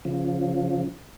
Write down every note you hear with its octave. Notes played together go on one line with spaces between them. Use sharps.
C#3 F3